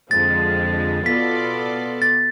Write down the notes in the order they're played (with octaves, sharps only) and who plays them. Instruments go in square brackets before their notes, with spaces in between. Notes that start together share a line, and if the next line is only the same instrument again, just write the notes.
[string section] F2 D3 F3 G#3 [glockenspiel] A6
[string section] B2 B3 F4 A4 D5 [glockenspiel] B6
[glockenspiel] A6